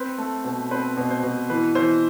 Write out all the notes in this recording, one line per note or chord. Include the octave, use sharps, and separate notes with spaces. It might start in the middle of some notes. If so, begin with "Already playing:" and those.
Already playing: C4 B4
A3
B2
C4 B4
B2
C5
B2
E3 B4
E3 C5